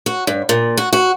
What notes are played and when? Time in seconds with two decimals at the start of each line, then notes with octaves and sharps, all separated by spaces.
0.06 F#4
0.27 G2
0.49 A#2
0.77 F#4
0.93 F#4